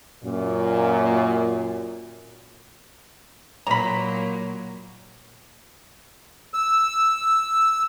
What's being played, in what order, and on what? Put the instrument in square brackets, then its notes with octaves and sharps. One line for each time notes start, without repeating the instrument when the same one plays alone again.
[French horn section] F#2 A#2
[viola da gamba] A#2 F#3 A#3 [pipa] A#5 B5
[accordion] E6